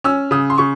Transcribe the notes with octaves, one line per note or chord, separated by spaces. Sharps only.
C#4 E6
C#3 D#6
C6
C#3 C#6